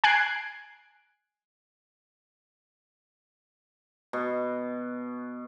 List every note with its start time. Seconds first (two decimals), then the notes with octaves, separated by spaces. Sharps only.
0.04 G#5 F#6 G#6 C7 D7
4.13 B2